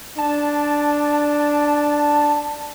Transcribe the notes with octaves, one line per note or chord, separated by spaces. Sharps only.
D4 A5